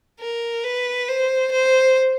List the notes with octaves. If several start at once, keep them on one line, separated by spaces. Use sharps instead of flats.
A#4
B4
C5
C5